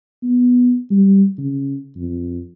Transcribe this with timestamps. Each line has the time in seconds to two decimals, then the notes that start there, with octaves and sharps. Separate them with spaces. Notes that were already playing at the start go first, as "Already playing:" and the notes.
0.23 B3
0.91 G3
1.38 C#3
1.96 F2